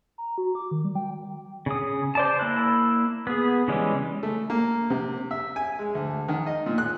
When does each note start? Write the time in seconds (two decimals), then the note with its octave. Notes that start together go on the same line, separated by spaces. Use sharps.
0.18 A#5
0.38 F#4
0.55 D6
0.71 D#3
0.84 G3
0.95 G5
1.66 C#3 D#6
2.15 C5 D5 A5
2.40 A#3 E4 F#6
3.27 B3 G#4
3.68 C#3 E3 G3 G#3 C#4
4.23 A3
4.50 A#3
4.90 C3
5.31 E5
5.56 G#5
5.79 G#3
5.95 D2
6.28 D#3
6.46 D#5
6.66 A#2
6.78 F#6